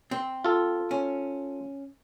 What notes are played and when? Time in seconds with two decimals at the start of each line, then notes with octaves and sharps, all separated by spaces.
0.11 C4
0.45 F4 A4
0.91 C#4